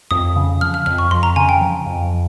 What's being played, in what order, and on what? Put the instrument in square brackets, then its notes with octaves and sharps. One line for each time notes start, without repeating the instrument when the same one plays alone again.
[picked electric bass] F2 [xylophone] D#6
[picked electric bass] C#3
[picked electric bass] F3 [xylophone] F6
[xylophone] F6
[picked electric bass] F2 [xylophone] F6
[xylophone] C#6
[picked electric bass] F2 [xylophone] C6
[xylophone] A#5
[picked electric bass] C#3 [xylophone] G#5
[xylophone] G5
[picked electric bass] F3
F2